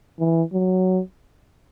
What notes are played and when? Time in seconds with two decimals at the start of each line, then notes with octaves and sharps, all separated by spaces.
0.20 E3
0.53 F#3